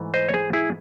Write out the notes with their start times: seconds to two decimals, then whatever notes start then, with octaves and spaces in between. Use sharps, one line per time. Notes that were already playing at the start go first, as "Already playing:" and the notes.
Already playing: G#2 E3 A3
0.14 C5 D#5
0.29 C#5
0.34 G#4 C5
0.53 E4 G#4